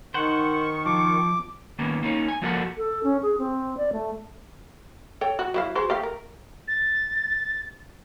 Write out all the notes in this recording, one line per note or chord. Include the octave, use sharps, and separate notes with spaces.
D#3 C5 F#5 C#6
F3 D6
D#3 A#3 B3 C#4
A#3 C#4 D#4
G#5
F3 A#3 F#4 A4 A#4 F#5
A4
C#4
G#4
C4
D5
A3
A4 C#5 G5
F#4
F#3 E4 F5
F#4 G#4 C5
A3 G4 F5
A#4
A6